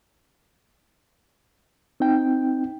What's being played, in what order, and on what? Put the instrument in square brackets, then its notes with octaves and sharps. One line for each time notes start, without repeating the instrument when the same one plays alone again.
[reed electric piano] C4 D#4 G5